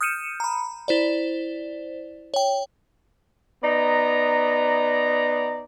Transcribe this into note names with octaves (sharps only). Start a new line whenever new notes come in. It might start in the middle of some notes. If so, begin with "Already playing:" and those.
D#6 F6 G6 C#7 D#7 E7
A#5 B5
E4 C5 D5
C#5 G5
B3 D#4 D5 A#5